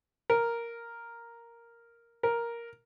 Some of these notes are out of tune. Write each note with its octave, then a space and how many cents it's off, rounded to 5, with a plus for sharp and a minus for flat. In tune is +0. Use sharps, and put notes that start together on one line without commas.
A#4 +0
A#4 +5